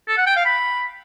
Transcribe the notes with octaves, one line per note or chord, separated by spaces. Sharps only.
A4
F#5
G5
F5
B5